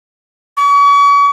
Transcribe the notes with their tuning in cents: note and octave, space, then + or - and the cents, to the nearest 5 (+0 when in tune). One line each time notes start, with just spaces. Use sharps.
C#6 +40